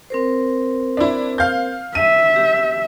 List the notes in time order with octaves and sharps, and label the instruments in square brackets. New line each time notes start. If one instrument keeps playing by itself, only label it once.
[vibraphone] C4 A#4 C5
[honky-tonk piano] D4 E4
F5 G6
[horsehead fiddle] E5 [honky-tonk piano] D#7
[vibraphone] G4